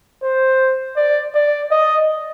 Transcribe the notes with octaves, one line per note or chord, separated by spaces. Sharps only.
C5
D5
D5
D#5